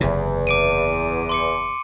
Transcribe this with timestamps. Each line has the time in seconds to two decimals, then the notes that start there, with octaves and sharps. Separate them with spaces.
0.01 F#1 E2 C3
0.47 D6 D7 D#7
1.29 C6 D6 C#7